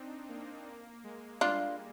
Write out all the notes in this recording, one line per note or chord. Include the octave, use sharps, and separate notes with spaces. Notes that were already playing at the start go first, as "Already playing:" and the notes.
Already playing: C4 D4 D#4
A#3
A#3
G#3
G3 D4 F4